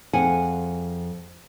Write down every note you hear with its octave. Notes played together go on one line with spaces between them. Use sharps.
F2 G#4 F#5 G#5